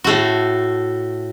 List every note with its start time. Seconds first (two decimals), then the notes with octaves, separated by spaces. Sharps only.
0.04 A2 A3 F#4